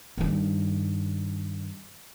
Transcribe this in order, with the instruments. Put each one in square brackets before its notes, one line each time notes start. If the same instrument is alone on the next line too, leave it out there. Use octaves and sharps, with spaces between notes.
[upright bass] G2 D#3